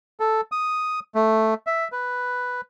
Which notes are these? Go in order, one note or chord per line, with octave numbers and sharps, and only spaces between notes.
A4
D#6
A3
E5
B4